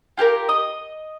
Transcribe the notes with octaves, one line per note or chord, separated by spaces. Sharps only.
F4 G4 G#4 A#4
D#5 D#6